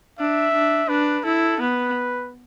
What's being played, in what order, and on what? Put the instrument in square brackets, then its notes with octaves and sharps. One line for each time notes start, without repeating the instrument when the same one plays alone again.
[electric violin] D4 [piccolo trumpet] E5
[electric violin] D4
[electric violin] D4 [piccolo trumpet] B4
[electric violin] E4 [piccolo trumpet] A4
[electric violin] B3 [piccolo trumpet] B4